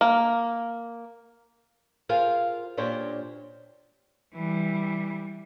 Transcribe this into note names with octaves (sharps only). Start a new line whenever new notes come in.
A#3
F4 G#4 A#4 C5 F5
A#2 D4 G4 C5 C#5
E3 G3